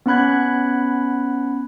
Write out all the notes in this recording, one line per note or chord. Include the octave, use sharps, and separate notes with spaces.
B3 C#4 F#5 B5 F#6 G#6